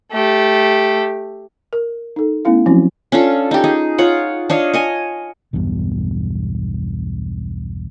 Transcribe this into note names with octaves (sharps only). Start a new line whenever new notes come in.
A3 G4
A#4
D#4 A4
A3 B3 C#4 E4 F5
F3 F#3 C4 C#4 E4 F#4
C#4 D4 F4 A4
D#4 G4
D#4 G#4
F4 C#5 F#5
D4 C#5 D#5 F5
C#5 D#5 G#5
B1 E2 G2 B2